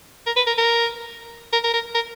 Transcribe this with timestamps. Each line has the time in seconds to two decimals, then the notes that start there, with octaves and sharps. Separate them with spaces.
0.26 A#4
0.37 B4
0.47 A#4
0.58 A#4
1.53 A#4
1.64 A#4
1.74 A#4
1.95 A#4